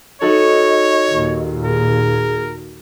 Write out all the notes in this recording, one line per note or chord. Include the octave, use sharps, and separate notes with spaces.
D#4 F#4 A4 C#5 D#5
D#2 A#2
G#4 A#4